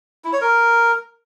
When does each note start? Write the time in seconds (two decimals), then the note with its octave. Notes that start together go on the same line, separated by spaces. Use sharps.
0.24 E4
0.33 C#5
0.41 A#4